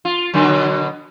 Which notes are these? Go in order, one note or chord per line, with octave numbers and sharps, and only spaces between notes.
F4
B2 D3 F#3